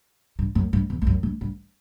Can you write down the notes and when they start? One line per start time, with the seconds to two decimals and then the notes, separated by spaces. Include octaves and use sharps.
0.39 G2
0.55 F#2
0.73 G2
0.90 E2
1.02 E2
1.07 F#2
1.23 G2
1.41 G2